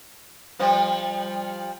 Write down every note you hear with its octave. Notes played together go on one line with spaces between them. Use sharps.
F3 G3 C5